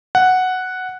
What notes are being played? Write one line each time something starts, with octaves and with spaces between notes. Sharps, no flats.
F#5